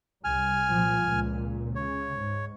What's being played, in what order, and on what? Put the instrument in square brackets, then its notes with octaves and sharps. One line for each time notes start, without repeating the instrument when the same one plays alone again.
[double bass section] C2 [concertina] G#5 F6
[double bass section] A#2 F3
C#2 A#2
[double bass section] C#3 [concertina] C#5
[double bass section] G#2